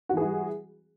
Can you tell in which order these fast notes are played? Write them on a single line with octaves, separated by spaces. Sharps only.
F#4 E3 G#4 E4 G3